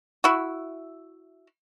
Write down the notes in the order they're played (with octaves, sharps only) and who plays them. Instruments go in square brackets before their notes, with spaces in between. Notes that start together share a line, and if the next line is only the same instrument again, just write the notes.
[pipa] E4 F#4